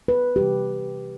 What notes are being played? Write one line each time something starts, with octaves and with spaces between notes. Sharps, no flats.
B4
C3 E3 G3 G4